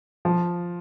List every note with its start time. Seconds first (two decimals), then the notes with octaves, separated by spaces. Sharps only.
0.25 F3